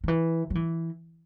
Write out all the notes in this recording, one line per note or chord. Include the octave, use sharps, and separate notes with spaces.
D#3
E3
F#3
E3